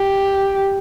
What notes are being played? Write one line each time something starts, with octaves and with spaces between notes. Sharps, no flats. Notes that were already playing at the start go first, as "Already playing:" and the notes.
Already playing: G4